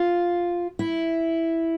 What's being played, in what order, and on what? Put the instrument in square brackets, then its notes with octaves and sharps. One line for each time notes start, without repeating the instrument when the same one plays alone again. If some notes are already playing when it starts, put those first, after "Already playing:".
Already playing: [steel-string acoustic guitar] F4
E4